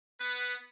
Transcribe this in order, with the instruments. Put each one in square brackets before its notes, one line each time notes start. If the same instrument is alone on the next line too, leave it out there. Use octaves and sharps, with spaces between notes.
[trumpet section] B3 B4